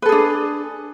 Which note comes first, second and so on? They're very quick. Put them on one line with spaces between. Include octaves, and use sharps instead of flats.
B4 A4 G#4 D4